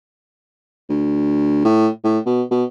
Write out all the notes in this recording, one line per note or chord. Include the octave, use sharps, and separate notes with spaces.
D2
A2
A2
B2
B2